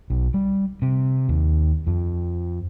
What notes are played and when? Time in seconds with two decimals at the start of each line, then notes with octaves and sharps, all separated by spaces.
0.10 B1
0.34 G3
0.82 C3
1.29 D#2
1.87 F2